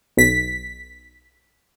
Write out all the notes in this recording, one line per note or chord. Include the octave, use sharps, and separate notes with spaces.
B1 B6